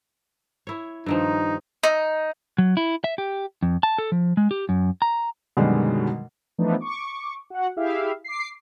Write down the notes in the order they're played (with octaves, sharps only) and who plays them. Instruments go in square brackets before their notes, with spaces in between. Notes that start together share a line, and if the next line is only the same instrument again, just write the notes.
[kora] E4 C#5
[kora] G2 D#3 F3 [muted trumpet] D#4
[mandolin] D#4
[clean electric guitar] F#3
E4
E5
G4
F2
A5
A4
F3
G#3
G4
F#2
A#5
[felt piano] F#2 B2 D3 D#3 G3 G#3
[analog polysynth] E3 F3 A3 B3 D4 D#4
C#6 D6
F#4 F#5
E4 G4 G#4 E5 F5
D6 C7